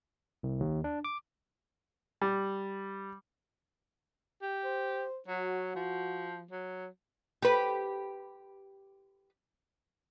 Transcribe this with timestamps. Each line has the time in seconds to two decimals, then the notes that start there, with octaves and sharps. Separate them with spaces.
0.43 C2
0.60 D#2
0.84 D4
1.04 D6
2.22 G3
4.42 G4
4.64 C5
5.28 F#3 F#4
5.76 F3
6.51 F#3
7.42 G4 B4